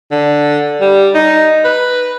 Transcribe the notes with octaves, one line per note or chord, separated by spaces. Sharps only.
D3
G3
D#4
B4